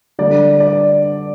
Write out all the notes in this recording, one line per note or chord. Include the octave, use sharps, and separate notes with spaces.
D3 G3 D5
D5